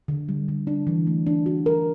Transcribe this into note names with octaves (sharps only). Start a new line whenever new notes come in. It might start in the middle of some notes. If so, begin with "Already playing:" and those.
D3
G3
D3
D4
E3
A3
D4
F#4
A#4